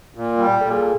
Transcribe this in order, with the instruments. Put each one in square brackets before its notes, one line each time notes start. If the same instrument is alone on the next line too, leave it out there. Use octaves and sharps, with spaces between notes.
[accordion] A#2
G3
[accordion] A#2 [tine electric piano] A4
[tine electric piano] G#4
A4